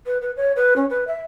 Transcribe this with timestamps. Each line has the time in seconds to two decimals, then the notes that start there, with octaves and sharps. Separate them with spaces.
0.06 B4
0.21 B4
0.36 C#5
0.56 B4
0.76 C#4
0.89 B4
1.07 E5